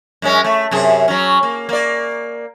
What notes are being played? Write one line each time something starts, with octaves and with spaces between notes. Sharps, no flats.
F#2 G#3 C#4
A3
F#2 C3 G#4
F#3 C#4
A#3
A#3 D5